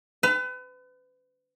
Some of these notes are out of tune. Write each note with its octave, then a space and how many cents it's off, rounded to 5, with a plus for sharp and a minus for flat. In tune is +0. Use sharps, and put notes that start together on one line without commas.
B4 +35